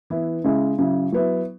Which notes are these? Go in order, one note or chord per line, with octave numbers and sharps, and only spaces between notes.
E3 B3 E4
C#3 G#3 E4
C#3 F#3 E4
F#3 B3 E4